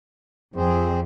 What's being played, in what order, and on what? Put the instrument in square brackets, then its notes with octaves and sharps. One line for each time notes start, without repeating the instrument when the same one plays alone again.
[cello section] F2 [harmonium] C4 G#4 C5